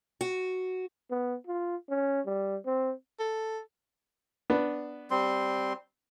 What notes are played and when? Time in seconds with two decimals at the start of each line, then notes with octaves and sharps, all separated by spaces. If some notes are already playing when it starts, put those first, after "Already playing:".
0.21 F#4
1.11 B3
1.47 F4
1.89 C#4
2.26 G3
2.66 C4
3.19 A4
4.50 B3 D4
5.11 G3 C4 C6